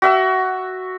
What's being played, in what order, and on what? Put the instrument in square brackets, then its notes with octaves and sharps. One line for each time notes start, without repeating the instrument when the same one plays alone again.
[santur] F#4 E5 E6